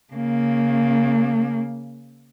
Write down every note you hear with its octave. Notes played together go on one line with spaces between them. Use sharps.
C#3 A#3